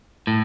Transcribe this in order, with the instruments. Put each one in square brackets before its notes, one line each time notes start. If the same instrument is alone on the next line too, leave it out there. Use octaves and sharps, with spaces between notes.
[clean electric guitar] A2